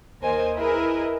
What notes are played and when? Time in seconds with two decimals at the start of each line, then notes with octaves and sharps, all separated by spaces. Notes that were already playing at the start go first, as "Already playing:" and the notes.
0.20 D#2 A#4 C5 D#5 G#5
0.56 E4 G#4 A#4 B4 D#5 E5